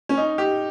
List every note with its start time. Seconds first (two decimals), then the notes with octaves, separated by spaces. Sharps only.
0.09 C#4
0.17 D#4
0.38 G4